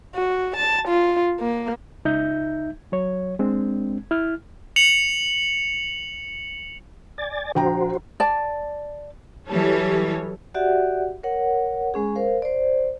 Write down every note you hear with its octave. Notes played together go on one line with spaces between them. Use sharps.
F#4
A5
F4
A#3
C#2 D#4 E5 G6
F#3 C#5
G#3 C4 D4
E4 F6
C#7 F7 F#7
D5 G#5 A6
A#1 F#4 C5 G5 A#5
D5 A5
E3 F#3 G3 A4 C#5
F#4 G4 D5 E5 F#5
A#4 C#5 F#5
G#3 C#4 G#4
A#4 C5 F5
C5 D5